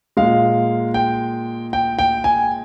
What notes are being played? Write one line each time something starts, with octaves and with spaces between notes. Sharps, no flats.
A#2 G#3 F5
G5
G5
G5
G#5